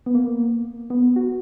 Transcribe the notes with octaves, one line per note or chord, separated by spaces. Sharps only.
B3
A#3
B3
F#4